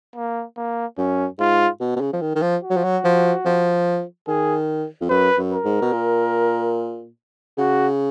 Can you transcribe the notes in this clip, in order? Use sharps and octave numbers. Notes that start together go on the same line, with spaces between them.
A#3
A#3
F#2 C#4
G#2 F4
B2
B2
C#3
F3
D#3
D#3
F3
F#4
F#3
F3
F#3
F3
F3
D#3 G#4
F2
F#2 B4
F#2
A#4
G#2
B2
A#2
C#3 F#4